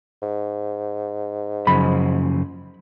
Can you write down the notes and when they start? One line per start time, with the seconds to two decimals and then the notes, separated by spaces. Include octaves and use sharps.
0.22 G#2
1.67 F#2 C#3 F3 B5